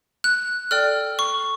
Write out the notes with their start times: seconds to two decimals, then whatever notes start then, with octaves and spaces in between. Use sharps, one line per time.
0.24 F#6
0.71 A4 D5 G5 F6
1.19 C#6